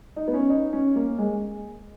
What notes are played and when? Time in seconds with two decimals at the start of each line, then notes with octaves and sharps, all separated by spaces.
0.16 D#4
0.28 B3
0.34 C#4
0.50 D#4
0.73 C#4
0.96 A#3
1.18 G#3